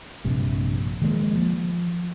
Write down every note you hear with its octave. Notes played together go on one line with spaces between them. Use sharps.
A#1 G2 C3
D#3 F3 G#3 A#3
F3